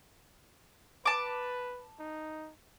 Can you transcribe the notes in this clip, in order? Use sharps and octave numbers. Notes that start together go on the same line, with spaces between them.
B4 A5 D6
D#4